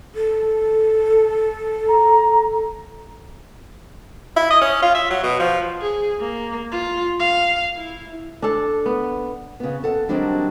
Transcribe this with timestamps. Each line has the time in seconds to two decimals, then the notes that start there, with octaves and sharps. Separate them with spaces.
0.15 A4
1.88 A#5
4.36 E4
4.50 D#5
4.61 C#4
4.82 F4
4.95 E5
5.10 F#3
5.23 B2
5.39 F3
5.81 G#4
6.21 A#3
6.72 F4
7.20 F5
7.76 E4
8.42 D4 A4
8.86 B3
9.60 C#3 B3
9.84 A4 F#5
10.09 D#3 F#3 G3 C4 D4 E4